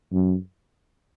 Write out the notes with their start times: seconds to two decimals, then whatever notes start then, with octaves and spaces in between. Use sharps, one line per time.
0.13 F#2